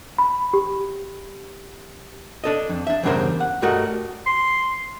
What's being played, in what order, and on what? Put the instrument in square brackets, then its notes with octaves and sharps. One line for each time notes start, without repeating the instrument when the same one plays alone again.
[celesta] B5
G4
[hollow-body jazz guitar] D4 A4 D#5
F2
D4 E5
E2 G2 C#3 D4 A#4 C5
F#5
G2 G3 A3 F#4 A#4 D#5
[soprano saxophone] C6